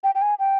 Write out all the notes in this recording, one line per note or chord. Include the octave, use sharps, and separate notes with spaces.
G5
G5
G#5
G5